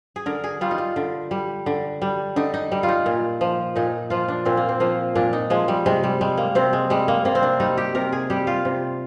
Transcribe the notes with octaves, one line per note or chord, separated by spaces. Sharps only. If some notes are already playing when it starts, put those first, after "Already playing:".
G#4
D3 A#4
G#4
G3 F4
D#4
F4
D3
G3
D3
G3
D3 D#4
D#4
G3
F4
D#4
A#2
F3
A#2 D#4
F3 F4
D4
A#2 C4
A#3
C4
F3 A#3
A#2 D4
D#4
F3 G#3
G3
C3 G#3
G3
G3 G#3
A#3
C3 C4
G#3
G3 G#3
A#3
C3 A#3
C4
D4
G3 D#4
G4
C3 A#4
G#4
G3 G4
F4
C3